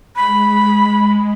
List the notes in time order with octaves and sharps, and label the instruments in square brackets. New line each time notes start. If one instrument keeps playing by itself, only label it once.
[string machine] G#3 [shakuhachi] B5